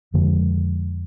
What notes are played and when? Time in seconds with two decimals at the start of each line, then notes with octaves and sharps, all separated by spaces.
0.14 F2 D3 F3 G#3